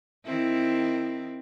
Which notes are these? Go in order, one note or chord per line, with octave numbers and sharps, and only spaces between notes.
D#3 C4 E4